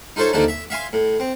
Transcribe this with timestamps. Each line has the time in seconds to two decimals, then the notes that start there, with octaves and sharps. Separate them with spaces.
0.16 D#4 F4 A4 C5 C#5
0.33 D#2 D3 F3 D4 D#4 A5
0.48 E5
0.70 E5 F5 G#5 C6
0.93 A2
1.20 C4